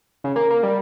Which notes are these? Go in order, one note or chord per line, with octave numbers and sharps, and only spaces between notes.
C#3
A#3
A#3
G3